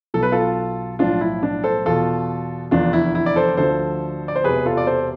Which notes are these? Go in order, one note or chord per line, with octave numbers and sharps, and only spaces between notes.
B1 B2 A4
B4
F4 A4
B1 A2 F3 D4 F4
E4
D4
A4 C5
E2 B2 F4 A4
F1 E2 D3 D4 F4
E4
E4
D5
A4 C5
D2 D3 F3 A4 C5
D5
C5
E1 E2 C3 E3 G#4 B4
F4 A4
D5
A4 C5